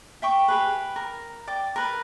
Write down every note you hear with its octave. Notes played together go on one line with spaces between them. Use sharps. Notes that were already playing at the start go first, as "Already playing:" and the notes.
E5 G5 C#6 D6
G4 G#4 B4
A#4
D5 G5 D6
A#4 B4